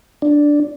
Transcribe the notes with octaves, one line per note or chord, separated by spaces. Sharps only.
D4